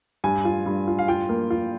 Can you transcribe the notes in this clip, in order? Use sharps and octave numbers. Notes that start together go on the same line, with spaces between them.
G2 G#5
F4
G2
F4
F5
F4 G5
A#3
F4